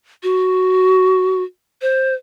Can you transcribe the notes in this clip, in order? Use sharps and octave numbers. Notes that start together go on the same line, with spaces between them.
F#4
C5